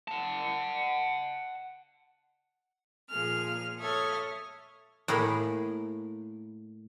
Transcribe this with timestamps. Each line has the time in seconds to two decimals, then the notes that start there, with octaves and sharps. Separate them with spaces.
0.08 F#5 A5
3.09 A#2 F3 G#4 F6
3.79 A4 C#5 E5 D#6 F6 G#6
5.08 A2 A#3 G#4 B5